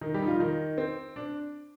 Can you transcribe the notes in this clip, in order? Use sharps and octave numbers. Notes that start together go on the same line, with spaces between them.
D#3 D#4
G3 G4
D#4
F3 F4
D#3 D#4
C4
D4